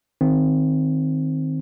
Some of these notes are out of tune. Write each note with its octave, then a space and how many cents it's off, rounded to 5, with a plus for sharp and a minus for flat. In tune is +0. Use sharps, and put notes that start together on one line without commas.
D#3 +0 C4 +0